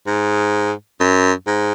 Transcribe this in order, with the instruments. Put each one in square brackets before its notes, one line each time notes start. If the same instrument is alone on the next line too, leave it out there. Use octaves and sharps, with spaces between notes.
[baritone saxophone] G#2
F#2
G#2